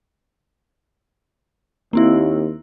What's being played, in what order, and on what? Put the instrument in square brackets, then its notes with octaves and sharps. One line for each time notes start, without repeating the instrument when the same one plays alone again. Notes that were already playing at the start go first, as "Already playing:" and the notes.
[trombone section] D#2 [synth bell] A#3 C4 E4